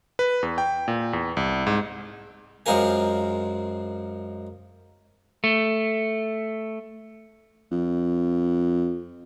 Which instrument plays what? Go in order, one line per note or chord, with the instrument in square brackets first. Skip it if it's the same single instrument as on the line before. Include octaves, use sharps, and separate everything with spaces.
[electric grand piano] B4
E2
G5
A#2
E2
C2
G#2
[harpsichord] F#2 G#3 C4 F4 A#4 G#5
[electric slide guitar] A3
[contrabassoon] F2